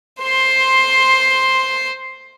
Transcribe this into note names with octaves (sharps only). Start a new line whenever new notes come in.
C5 C6